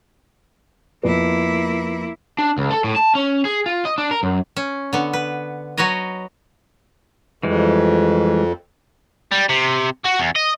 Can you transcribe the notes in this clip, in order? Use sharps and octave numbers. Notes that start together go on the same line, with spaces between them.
F2 A#3 B3 E4
D4
C#2
A4
A2
A5
C#4
G#4
F4
D#5
D4
A#4
F#2
C#4
D3 B3
B4
F#3 F#4 B4 C#5 D#5
F2 E3 G3 G#3
G3
C3
F#4
E2
D#5